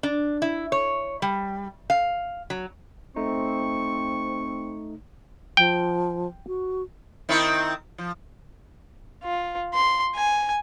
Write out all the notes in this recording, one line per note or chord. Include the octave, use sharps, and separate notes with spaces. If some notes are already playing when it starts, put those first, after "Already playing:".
D4
E4
C#5
G3
F5
F#3
A3 C4 D#4 C#6
F3 G5
F#4
D#3 C4 E4
F3
F4
C6
G#5